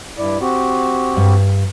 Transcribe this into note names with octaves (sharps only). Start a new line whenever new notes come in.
G2 E4 D5
C4 F#4 G4
G2